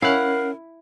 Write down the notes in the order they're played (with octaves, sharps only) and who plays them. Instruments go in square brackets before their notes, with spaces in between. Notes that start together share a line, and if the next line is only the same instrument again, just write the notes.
[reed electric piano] C#4 [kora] E4 [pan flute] A#4 [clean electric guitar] F5 F#5